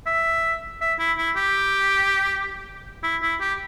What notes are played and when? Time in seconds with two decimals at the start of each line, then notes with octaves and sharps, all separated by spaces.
0.06 E5
0.81 E5
0.99 E4
1.18 E4
1.36 G4
3.03 E4
3.22 E4
3.40 G4